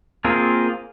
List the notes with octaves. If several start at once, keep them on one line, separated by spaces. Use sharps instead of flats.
A#3 C4 F4 G#4 A#4